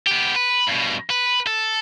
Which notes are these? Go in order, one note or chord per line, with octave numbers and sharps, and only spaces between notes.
B3 G4
B4
G2 B2
B4
A4